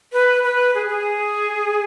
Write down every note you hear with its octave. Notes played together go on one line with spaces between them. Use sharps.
B4
B4
G#4
G#4